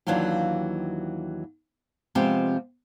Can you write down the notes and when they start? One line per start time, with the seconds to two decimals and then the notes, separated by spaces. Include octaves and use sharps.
0.07 D#2 E3 F#3 D4 F4 G4
2.15 C3 F3 G#3 B3 C4 G4